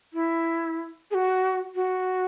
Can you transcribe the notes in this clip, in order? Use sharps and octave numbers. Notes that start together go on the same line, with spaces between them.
E4
G#4
F#4
F#4